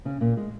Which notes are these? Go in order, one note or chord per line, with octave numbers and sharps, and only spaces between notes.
C#3 C#4
A#2 A#3
G#3